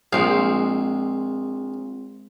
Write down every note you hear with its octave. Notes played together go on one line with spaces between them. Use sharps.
A#1 G#3 C4 F5